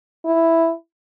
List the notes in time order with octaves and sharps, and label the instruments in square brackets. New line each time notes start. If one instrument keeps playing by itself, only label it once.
[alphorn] E4